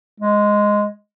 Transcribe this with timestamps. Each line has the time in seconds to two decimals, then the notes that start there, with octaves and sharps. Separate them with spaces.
0.20 G#3